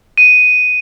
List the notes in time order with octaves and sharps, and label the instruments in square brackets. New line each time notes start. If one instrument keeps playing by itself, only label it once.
[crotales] D#7